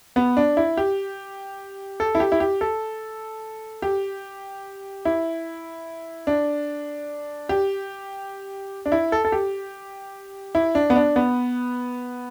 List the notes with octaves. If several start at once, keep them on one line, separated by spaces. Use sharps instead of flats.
B3
D4
E4
G4
A4
E4
G4
E4
G4
A4
G4
E4
D4
G4
D4
E4
A4
A4
G4
E4
D4
B3
D4
B3